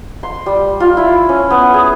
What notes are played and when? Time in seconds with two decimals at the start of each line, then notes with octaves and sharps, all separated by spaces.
0.23 C6
0.46 G3
0.80 F4
0.97 E4
1.29 C#4
1.50 B3
1.74 G#4